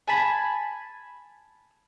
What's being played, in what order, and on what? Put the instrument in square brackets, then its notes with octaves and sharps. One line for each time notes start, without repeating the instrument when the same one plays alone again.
[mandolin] G#5 A5 B5